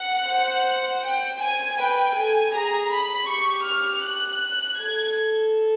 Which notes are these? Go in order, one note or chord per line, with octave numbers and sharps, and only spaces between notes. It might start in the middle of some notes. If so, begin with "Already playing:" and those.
Already playing: F#5
C5
G5
G#5
B4 G5
A4 G#5
G#4 A#5
B5
G4 C#6
F6
F#6
A4 G#6